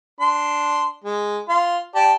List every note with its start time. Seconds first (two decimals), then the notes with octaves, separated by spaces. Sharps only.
0.21 D4 C6
1.04 G#3
1.49 F4 C6
1.95 G4 D5 A5